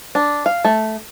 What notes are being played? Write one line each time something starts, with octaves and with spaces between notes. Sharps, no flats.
D4
F5
A3